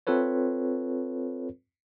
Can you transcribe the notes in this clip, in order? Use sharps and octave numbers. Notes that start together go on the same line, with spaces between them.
C4 F4 A4 B4 C#5